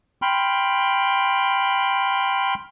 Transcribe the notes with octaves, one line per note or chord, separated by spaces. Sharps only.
G5 B5 C6 F6